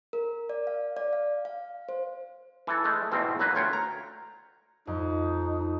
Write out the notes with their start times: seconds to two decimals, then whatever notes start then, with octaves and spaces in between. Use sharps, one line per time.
0.13 A#4
0.49 D5
0.67 F5
0.97 D5
1.13 F5
1.45 F5
1.89 C5
2.67 E3 A4
2.84 G#3 A3
3.12 E2 G#2 B2 C4
3.39 F#3 A#3 B4
3.55 D2 F4 C#5 G5
3.73 A#5
4.87 F2 D#4